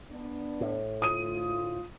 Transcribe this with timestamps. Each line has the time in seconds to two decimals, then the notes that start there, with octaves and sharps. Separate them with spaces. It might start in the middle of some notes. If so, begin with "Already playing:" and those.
0.12 B3 D4
0.61 A2
1.02 D2 F4 D#6 D#7